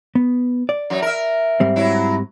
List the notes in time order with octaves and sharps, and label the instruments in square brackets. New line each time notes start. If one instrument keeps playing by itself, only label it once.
[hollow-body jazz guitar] B3
D5
[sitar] F#2 F#3
A#4 E5
[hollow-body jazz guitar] G#2 G3 C4
[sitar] F#3 E4